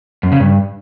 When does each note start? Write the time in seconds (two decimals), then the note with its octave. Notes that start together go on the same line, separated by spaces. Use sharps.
0.23 F#2
0.32 C#3
0.40 G2